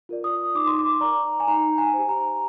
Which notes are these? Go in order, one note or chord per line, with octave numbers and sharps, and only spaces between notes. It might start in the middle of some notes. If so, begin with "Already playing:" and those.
F4 A#4 D5
D#6
D#4 D6
C6
D6
A#4 D5 A#5
G#5
D#4 A#5
G#5
G4 C5
A#5